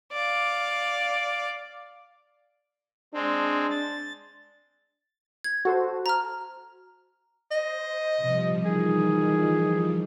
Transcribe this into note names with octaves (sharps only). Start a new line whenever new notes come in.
D5 F5
G#3 C4 D4
A6
G#6
F#4 A4 C5
A#5 F6
C5 D#5
C3 F3 G3
D#3 E3 G#4